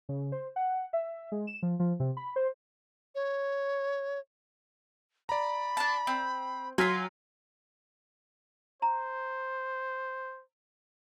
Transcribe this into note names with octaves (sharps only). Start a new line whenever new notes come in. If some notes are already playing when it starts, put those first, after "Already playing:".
C#3
C5
F#5
E5
G#3
E7
F3
F3
C3
B5
C5
C#5
D5 A#5 B5
D4 A5
C4
F#3 F4 G#5 C6 F6 B6
C5 A#5